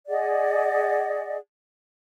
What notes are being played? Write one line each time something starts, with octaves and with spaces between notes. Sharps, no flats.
G#4 D5 D#5 F#5